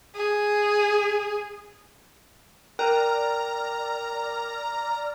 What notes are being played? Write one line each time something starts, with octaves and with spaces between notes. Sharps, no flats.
G#4
A#4 D5 G5 A#5 F6 F#6